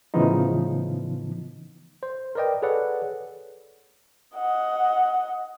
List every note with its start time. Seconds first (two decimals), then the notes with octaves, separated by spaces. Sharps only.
0.14 A2 C#3 E3 F3 B3 D#4
2.03 C5
2.35 A#4 B4 D5 D#5 G5
2.62 G#4 A4 B4 C#5 D5 F#5
4.36 D#5 F#5